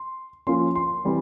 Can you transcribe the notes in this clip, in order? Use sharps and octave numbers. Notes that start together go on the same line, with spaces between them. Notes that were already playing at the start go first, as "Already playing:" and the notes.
Already playing: C6
F3 A#3 C#4 C6
C6
E3 G3 C4